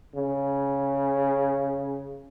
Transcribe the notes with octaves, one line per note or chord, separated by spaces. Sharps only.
C#3